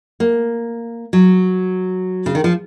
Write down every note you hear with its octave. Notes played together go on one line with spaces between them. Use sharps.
A#3
F#3
C#3
D#3
F3